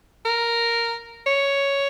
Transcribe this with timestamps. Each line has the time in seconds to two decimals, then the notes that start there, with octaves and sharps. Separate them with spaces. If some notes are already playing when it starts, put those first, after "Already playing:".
0.25 A#4
1.27 C#5